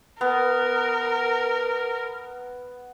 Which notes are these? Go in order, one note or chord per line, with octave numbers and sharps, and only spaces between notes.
B3 A#4